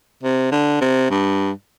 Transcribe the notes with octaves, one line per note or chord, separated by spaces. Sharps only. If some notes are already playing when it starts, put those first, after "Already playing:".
C3
D3
C3
G2